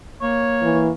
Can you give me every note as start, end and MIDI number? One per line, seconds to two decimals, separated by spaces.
0.22 0.91 58
0.22 0.86 73
0.63 0.90 52